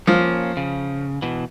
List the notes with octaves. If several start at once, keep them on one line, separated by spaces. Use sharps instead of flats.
F3 A#3 C#4
C#3
B2 E3